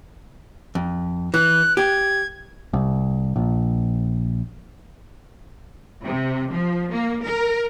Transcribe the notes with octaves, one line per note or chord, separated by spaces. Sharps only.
F2
E3 F#6
G4 G#6
C2
A#1
C3
F3
A#3
A#4